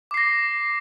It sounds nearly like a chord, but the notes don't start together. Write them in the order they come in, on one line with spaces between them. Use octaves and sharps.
D6 C7 A#6